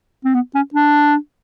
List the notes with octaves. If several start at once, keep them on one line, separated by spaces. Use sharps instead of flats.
C4
B3
C#4
D4